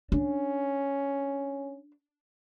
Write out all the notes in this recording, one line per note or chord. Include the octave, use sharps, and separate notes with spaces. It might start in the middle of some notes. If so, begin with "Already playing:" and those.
C#4 D4